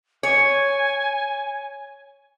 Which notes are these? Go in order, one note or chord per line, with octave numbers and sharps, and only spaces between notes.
C#5 G#5